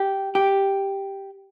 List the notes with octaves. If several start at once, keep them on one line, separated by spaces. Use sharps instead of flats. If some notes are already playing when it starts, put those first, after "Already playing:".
Already playing: G4
G4